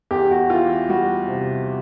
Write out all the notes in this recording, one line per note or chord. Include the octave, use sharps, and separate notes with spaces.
E2 G4
F#4
E3 F4
G3 F#4
C3